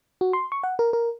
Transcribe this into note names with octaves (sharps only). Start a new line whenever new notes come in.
F#4
C6
C#6
F#5
A#4
A#4